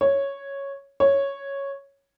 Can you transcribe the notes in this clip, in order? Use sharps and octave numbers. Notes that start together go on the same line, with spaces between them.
C#5
C#5